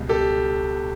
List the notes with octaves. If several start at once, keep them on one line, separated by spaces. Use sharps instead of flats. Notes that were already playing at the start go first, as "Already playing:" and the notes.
Already playing: C#2 B2 G3
G4 A4